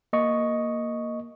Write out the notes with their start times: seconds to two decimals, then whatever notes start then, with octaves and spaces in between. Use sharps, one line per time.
0.13 A#3 D#5 C#6